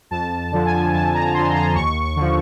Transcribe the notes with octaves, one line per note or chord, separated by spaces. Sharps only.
F2 A5
D3 F3
G#5
F2 A5
A#5
D3 F3 C6
A#5
D#2 C#6
C#6
D3 F3